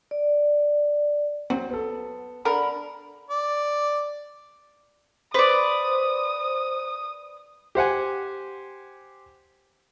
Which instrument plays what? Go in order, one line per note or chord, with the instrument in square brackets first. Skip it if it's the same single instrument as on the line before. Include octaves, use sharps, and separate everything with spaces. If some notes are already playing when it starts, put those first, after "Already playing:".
[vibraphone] D5
[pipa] F#3 [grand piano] C4
[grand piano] B3 A4
[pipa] D3 A#4 [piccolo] B5
[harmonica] D5
[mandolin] B4 D5 [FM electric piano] C5 [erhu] D#6
[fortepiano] G4 C5 F#5 G#5